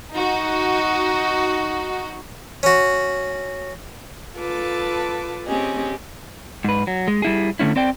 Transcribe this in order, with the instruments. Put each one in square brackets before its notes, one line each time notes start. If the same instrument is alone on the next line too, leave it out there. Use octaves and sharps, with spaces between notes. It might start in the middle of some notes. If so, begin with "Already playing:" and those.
[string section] D#4 F#4
[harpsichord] C#4 F#4
[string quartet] F4 A4 B4 A5 D6
C4 C#4 G4 G#4 D#5
[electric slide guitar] G#2 B4
F#3
G#3
G3 E4 G#4
D3 A3 C#4 E4
C4 D5 G5